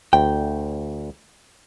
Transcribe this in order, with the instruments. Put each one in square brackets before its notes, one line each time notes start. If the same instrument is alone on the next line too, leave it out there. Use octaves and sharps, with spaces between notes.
[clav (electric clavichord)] D2 [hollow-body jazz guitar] G5